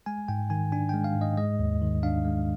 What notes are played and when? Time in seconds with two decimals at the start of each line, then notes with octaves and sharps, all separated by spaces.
0.06 G#3 G#5
0.28 G#2 G5
0.50 D#3 G#5
0.72 D4 G#5
0.89 G#3 G5
1.04 F5
1.16 G#2
1.21 D#5
1.37 G#3 D#5
1.59 D#2
1.82 D#3
2.03 D4 F5
2.25 G#3